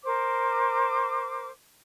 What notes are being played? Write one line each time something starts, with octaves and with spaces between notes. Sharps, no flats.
A#4 C5 D6